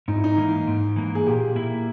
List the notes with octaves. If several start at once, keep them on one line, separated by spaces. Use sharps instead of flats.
G#2 D#4
E4
D#4
E3 A#3
G#2
E3 A#3
G#4
A#2 G4
A#3 E4